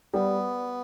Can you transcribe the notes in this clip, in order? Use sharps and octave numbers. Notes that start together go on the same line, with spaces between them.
G3 B3